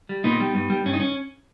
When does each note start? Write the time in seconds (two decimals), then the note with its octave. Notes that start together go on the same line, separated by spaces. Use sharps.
0.09 G3
0.24 A#2 B3 D#4
0.40 G3
0.55 G2
0.70 G3
0.86 G2 C#4
0.93 D#4
1.00 C#4